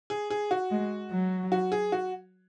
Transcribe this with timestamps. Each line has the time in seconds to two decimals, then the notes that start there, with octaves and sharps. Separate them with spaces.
0.10 G#4
0.30 G#4
0.51 F#4
0.71 G#3
1.12 F#3
1.52 F#4
1.72 G#4
1.92 F#4